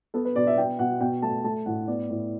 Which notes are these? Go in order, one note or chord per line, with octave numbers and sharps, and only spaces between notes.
B3 A4
B4
B2 D5
E5
B3 G5
B2 F#5
B2 G5
A3 A5
A3 A5
A2 F#5
B3 D5
A2